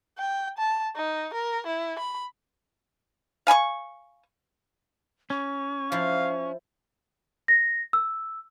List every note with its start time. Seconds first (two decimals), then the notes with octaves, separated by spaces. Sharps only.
0.18 G5
0.58 A5
0.96 D#4
1.34 A#4
1.67 E4
1.99 B5
3.47 F5 G#5 B5 C#6
5.30 C#4 C#6
5.92 F3 E4 F5
7.48 A#6
7.93 E6